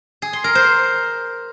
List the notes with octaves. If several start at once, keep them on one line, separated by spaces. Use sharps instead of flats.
G#4
C6
A#4
C5